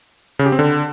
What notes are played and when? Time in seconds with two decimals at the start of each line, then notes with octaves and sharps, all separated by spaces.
0.39 C#3
0.46 G4
0.52 C4
0.59 D3